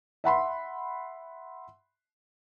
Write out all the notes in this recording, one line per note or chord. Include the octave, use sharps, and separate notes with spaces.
E5 F#5 B5 C6